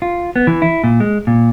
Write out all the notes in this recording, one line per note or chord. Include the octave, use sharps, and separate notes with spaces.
F4
B3
E3
E4
A#2
G#3
A#2